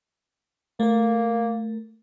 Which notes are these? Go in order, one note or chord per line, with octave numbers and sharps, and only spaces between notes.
A3 A#3 A#4